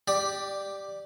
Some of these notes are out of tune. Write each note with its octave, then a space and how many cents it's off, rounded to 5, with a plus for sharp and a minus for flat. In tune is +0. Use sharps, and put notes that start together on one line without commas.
G4 +0 D5 +10